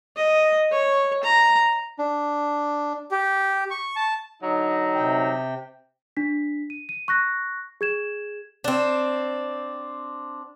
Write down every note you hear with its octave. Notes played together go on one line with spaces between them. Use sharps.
D#5
C#5
A#5
D4
G4
C#6
A5
D3 F#3 D#4
C3 G5
D4 B6
D#7
D#7
C#6 F#6 A#6
G#4 G#6 E7
C4 D4